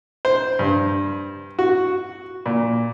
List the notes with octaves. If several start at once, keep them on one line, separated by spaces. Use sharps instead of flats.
C5
G2
F#4
A#2